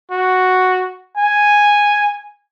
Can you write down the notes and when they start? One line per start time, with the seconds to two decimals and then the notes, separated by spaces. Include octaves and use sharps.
0.11 F#4
1.17 G#5